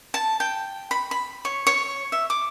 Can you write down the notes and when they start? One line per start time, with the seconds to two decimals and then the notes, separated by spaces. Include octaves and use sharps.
0.14 A5
0.40 G5
0.91 B5
1.11 B5
1.45 C#5
1.67 C#5
2.12 E5
2.30 D6